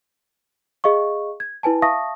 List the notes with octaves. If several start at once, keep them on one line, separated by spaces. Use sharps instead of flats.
G#4 D#5 F5 C#6
G#6
E4 B4 G#5 A5
E5 F5 A5 C#6 D#6 A#6